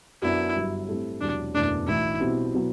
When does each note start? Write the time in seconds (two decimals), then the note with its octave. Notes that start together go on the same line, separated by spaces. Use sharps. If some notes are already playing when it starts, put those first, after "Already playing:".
0.22 F#2 F#3 B3 D4 E4
0.55 G1 G2 F#3
0.88 A2 G3 C4 E4 A4
1.21 E1 E2 C3 F#3 D4
1.54 F#1 E2 B2 A3 D4
1.87 B1 A2 E3 E4
2.20 B2 G3 C4 E4
2.54 B2 F#3 B3 E4